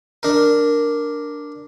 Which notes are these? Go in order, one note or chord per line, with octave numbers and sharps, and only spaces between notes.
D4 A#4